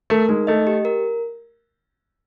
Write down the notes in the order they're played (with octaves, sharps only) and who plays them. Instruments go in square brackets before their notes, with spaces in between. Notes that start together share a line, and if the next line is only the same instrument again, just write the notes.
[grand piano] A3 [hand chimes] A#4
[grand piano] G#3 [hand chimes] D#4
[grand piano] A3 [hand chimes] D#5
[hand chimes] G4
A#4